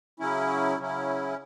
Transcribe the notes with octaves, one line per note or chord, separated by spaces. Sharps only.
C#3 F#3 C#4 E4
C#3 F#3 C#4 E4